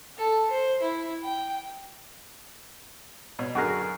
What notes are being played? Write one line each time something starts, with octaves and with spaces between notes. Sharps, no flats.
A4
C5
E4
G5
B2 C#5
F#2 D3 F#4 G#4 A#4